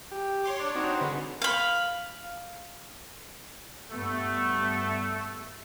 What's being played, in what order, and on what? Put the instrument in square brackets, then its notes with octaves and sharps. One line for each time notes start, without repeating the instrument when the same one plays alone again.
[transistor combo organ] G4
[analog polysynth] C#5 C6 D6
[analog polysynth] D4 C#5 [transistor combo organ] D5
[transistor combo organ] C4 D#4 F#4
[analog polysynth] D3 G#3 [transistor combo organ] B4
[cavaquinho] F5 B5
[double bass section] G2 G3 B3 [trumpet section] A3